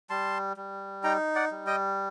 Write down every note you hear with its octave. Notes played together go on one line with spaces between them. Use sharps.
G3 A5 C6
G3
D#4 G5 A#5
D5 F#5
G3
D#5 G5